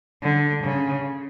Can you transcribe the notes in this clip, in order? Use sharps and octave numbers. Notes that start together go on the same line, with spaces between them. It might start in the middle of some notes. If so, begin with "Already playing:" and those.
D3
C#3